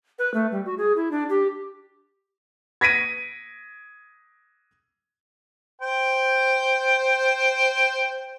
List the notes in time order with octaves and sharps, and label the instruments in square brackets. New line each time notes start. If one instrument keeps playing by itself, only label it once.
[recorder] B4
A3
G3
F#4
G#4
E4
D4
G4
[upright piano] G#6 A#6 B6 D7 D#7
[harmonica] C5 G5